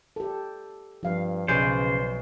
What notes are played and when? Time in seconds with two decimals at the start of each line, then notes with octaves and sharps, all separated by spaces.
0.16 G4 A4
1.03 G2 F3 F5
1.48 B1 C#3 C5 D5 G#5